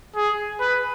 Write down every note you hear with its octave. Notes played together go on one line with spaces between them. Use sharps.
G#4
B4